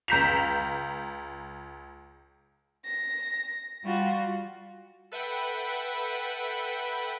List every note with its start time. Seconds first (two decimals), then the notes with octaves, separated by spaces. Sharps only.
0.08 C#2 A#5 G6 B6 E7 F7
2.84 A#6
3.84 G3 F4 F#4
5.12 A4 B4 E5 F#5 G5 B5